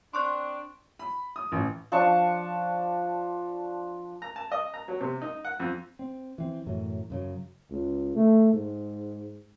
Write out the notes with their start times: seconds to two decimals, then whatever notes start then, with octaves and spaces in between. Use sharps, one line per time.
0.13 C4 D4 C6 C#6 F#6
0.99 B5
1.36 D#6
1.52 A1
1.92 F3 D4 A5 C#6
4.22 A#5
4.36 A5
4.52 D#5
4.74 A#5
4.88 F#3
5.01 C3
5.22 D#4
5.45 F#5
5.60 F2
5.99 C4
6.38 E3 C4
6.66 F#2 A2 E3 F#3
7.10 F#2 C#3 F#3
7.70 C#2
8.15 A3
8.53 G#2